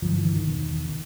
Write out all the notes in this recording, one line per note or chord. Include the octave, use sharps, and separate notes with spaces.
G2 D3 F3
E3
E3
D#3
E2 B2
D#3